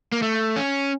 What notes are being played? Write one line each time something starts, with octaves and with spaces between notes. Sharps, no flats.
A#3
A3
C#4